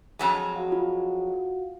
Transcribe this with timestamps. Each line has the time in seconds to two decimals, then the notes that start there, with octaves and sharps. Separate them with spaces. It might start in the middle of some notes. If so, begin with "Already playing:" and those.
0.19 F2 F#3 G#3
0.56 F#4 F5 F#5
0.72 F4